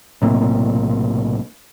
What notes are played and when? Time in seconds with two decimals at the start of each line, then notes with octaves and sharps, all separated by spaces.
0.22 B1 A2 C3 A#3